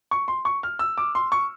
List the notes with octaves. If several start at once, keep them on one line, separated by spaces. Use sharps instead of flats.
C#6
C6
C#6
F6
E6
D6
C6
C#6